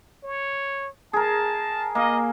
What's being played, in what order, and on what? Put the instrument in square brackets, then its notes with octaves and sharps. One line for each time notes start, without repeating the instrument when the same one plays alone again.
[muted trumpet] C#5
[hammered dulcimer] G#4 A#4 [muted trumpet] A5
[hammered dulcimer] A#3 F5 [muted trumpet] D#5